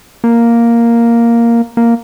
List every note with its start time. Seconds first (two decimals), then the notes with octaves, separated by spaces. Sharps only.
0.24 A#3
1.77 A#3